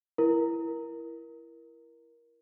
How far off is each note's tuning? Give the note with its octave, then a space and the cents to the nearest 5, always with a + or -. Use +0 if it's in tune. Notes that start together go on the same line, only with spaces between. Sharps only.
E4 +15 A#4 +15